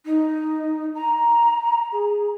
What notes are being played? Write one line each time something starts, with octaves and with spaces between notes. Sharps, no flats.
D#4
A#5
G#4